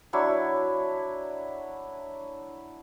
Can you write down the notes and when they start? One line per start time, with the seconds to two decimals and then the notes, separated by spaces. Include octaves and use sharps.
0.13 F#3 D4 E4 C#5